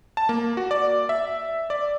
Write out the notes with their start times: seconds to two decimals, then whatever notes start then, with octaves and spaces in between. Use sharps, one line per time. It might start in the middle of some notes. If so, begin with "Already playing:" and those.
0.17 A5
0.29 A#3
0.57 F#4
0.71 D5
1.09 E5
1.70 D5